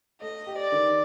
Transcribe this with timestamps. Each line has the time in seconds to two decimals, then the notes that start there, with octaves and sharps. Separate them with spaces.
0.21 A3 D#5
0.46 G4
0.58 D5
0.72 D#3